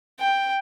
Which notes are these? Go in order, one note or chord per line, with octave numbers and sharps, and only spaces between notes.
G5